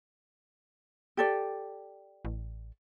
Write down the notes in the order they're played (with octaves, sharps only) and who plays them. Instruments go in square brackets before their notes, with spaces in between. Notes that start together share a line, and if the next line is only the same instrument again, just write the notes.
[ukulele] G4 A4 D5
[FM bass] A1